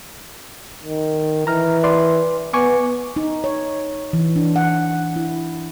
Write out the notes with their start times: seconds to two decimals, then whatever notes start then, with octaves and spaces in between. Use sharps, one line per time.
0.84 D#3
1.47 E3 A#5 F6
1.83 B4 D5 C6
2.53 B3 G#5 C#6 D6
3.16 D#4
3.44 C#5
4.13 E3
4.36 D4
4.56 F#5
5.16 E4